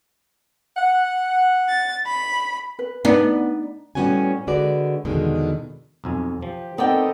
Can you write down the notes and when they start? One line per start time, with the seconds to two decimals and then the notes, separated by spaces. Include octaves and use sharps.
0.75 F#5
1.69 A6
2.07 B5
2.79 B4
3.05 B3 D4 D#4 D5
3.95 A2 G3 B3 C#4 F#4 G#5
4.47 D3 G#3 F#4 B4 D5
5.05 E2 B2 D3 D#3 G#3
6.04 B1 F2 G#5
6.42 F3 G4
6.78 B3 C4 D#4 A4 A#4 D5 D#5 G5